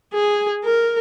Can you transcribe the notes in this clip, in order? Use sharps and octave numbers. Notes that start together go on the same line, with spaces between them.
G#4
A#4